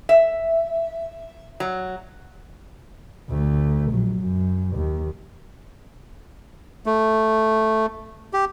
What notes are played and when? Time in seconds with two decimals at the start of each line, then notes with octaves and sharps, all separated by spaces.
0.09 E5
1.60 F#3
3.29 D2 A3
3.91 A#1 F#3
4.20 F#2
4.75 D#2
6.86 A3
8.33 G4